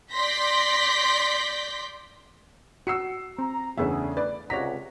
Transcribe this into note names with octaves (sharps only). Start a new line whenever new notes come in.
D5 C6 G6 A#6 B6
F#4 E6 C7 C#7
C4 A#5
E2 C#3 A3 B3 D4 G#4 E5
B4 D5
C#2 C3 C#5 D5 F#5 A#5 B6